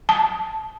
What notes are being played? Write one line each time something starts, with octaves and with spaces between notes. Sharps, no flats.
A5